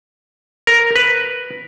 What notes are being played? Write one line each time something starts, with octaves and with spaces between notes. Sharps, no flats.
A#4
B4